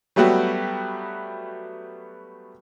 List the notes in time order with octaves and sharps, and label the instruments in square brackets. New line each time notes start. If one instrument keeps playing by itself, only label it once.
[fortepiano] F#3 G3 A3 B3 F#4 G4